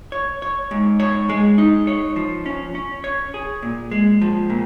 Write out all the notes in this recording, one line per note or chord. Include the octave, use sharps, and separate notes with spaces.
C#5
C#5
G#2
C#5
G#3
D#4
C#5
F3
C#4
C#4
C#5
G#4
A#2
G#3
F3
A#2